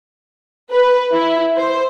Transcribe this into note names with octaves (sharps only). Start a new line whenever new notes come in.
B4
E4
C5